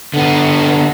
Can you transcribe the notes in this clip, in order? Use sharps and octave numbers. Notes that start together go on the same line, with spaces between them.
D3 B3